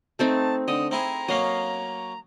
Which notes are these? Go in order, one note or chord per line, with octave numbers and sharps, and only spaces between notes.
A3 C4 D#4 A5
D3 D#5 D#6
C4 E4 G#4 A#5
F#3 A#3 C#4 D#5 F5